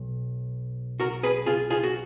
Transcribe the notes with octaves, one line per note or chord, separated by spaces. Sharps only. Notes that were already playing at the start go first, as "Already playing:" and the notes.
Already playing: B1
F#4 A#4
G#4 B4
F4 G#4
F4 G#4
F#4